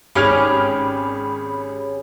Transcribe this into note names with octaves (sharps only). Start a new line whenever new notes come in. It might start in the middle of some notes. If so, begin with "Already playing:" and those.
G#1 C#4 G4 G#4 B5 F6 F7